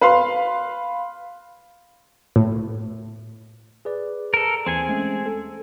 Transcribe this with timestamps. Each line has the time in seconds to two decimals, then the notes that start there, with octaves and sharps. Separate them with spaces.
0.01 B4 F5 C6
2.36 A2
3.85 G#4 B4 D5
4.34 A4 A#4
4.66 D#2 E3 C4 G#4 G#5 C#7
4.89 G#3 A3 C#4
5.26 A4